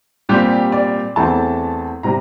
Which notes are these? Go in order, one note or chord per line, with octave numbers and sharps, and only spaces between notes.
A#2 G3 C4 G4
D5
E2 E3 A3 C4 A5
C3 G3 A#5